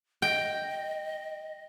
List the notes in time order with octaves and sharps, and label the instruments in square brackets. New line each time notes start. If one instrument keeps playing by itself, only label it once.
[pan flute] D#5 [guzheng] G5